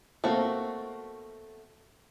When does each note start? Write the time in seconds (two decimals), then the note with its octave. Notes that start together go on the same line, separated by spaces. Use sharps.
0.24 B2 A3 A#3 C4 F#4